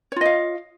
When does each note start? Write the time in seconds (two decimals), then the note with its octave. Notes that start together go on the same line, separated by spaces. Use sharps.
0.12 C#5
0.16 F4
0.21 D#5
0.25 F5